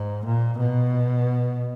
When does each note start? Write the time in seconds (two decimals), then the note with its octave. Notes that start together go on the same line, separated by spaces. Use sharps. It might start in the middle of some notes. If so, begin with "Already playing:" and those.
Already playing: G#2
0.25 A#2
0.58 B2